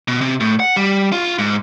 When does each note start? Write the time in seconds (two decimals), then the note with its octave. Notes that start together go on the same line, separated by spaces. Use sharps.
0.08 B2
0.21 C3
0.40 A2
0.60 F#5
0.76 G3
1.12 F4
1.39 G#2